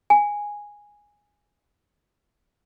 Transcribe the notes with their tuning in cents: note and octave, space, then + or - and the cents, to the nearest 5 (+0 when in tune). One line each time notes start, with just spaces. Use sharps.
G#5 -5